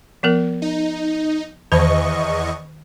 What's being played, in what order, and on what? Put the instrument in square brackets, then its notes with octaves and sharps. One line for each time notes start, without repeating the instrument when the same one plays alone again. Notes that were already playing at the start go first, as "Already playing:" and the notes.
[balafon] F3 B3 A#4
[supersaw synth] D#4
[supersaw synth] E2 D#5 C#6 [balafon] D#3 C5 A5